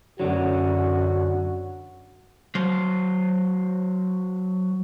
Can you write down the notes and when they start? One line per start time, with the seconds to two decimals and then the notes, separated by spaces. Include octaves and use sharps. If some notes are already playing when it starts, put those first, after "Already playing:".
0.20 F#2 D3 F#3 F#4
2.55 F#3 C5